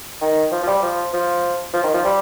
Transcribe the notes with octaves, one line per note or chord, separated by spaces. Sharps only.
D#3
F3
F3
G3
F3
F3
F3
D#3
F3
G3